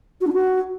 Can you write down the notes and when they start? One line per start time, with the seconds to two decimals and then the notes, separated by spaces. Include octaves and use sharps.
0.20 F#4
0.27 D4
0.33 F#4